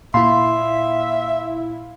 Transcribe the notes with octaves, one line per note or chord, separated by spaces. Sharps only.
A#2 E4 E5 F5 B5 C6